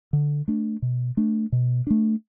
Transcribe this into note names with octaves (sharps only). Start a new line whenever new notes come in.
D3
A3 D4
B2
A3 D4
B2
A3 D4